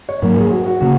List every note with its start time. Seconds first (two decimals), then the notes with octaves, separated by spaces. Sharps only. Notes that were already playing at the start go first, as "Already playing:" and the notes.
0.09 C#5
0.22 G#2 F#3 A#3 A#4
0.37 G#4
0.51 F#4
0.66 F#4
0.80 C#3 A#3 F#4